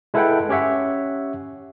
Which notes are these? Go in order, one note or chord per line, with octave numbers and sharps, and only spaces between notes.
G#3 E4 A4 B4 F#5 G5
C#4 G4 C#5 E5 F#5